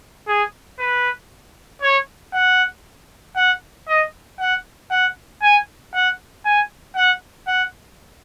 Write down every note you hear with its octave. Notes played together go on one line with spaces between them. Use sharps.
G#4
B4
C#5
F#5
F#5
D#5
F#5
F#5
G#5
F#5
G#5
F#5
F#5